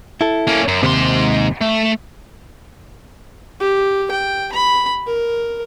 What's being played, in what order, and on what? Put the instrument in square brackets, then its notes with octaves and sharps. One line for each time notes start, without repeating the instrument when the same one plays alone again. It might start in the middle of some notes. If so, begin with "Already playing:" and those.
[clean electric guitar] E4 A4
[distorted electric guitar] A#3 C#4
F#2
[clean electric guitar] D#2 C3 [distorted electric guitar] G#2 C6
[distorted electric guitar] A3
[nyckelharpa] G4
G5
B5
A#4